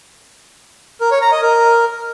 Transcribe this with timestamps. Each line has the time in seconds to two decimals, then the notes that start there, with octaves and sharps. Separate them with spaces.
1.01 A#4
1.11 C#5
1.21 A#5
1.32 D#5
1.42 A#4